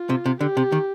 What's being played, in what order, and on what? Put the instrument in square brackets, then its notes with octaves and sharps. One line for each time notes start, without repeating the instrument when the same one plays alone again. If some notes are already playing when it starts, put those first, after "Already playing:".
Already playing: [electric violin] F4
[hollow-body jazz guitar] C3
C3
[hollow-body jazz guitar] D3 [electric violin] G4
[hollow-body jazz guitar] C3
D#3